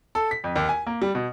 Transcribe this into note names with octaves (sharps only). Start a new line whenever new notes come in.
A4
B6
F2
D#2
G#5
A#3
G3
B2